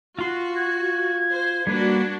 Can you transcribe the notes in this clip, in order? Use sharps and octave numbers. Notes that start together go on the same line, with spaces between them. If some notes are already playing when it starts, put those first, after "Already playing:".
F4 F#4 C6
G#6
C5
G3 A#3 D4 F#4 B4